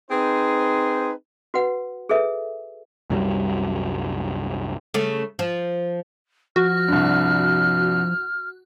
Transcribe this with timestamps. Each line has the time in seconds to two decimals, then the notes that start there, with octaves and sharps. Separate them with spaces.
0.11 C4 D#4 G#4 B4 C5
1.54 F#4 B4 F#5
2.09 G#4 A4 B4 E5
3.10 C2 F#2 F#3 G3
4.94 C#3 A3
5.39 F3
6.56 F3 F#4 F6
6.88 C2 G2